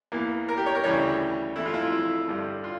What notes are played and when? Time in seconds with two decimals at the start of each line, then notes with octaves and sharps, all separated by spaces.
0.12 E2 E3 A#3
0.49 A#4
0.57 G4
0.66 C#5
0.75 A#4
0.84 D2 C#3 E3 G3 C#5
1.56 F2 E3 A3 E4
1.66 F4
1.74 E4
1.83 F4
1.92 E4
2.28 G2 D3 G3
2.64 F4